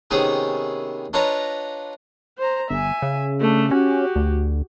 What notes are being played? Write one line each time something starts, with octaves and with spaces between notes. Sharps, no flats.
C3 D#3 B3 C#4 D#4 G#4
D4 F4 B4 C#5 D#5 A#5
C5 A#5
G1 E5 G#5
C#3
A3 D4
C#4 F#4 G4
D2